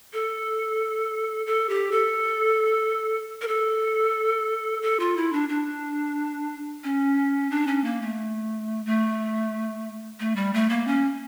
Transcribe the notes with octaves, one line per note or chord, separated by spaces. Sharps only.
A4
A4
G4
A4
A#4
A4
A4
F4
E4
D4
D4
C#4
D4
C#4
A#3
A3
A3
A3
G3
A3
A#3
C#4